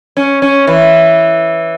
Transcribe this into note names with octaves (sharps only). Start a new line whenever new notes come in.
C#4
C#4
E3